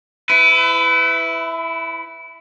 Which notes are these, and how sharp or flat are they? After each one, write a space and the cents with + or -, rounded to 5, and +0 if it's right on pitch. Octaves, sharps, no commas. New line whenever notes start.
E4 +0 B4 +30